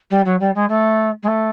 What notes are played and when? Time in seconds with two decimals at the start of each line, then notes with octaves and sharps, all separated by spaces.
0.10 G3
0.25 F#3
0.40 G3
0.55 G#3
0.69 A3
1.23 G#3
1.27 A3